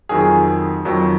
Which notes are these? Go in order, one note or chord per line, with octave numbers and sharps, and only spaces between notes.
F2 D#3 F#3 G#4
F2 D#3 F#3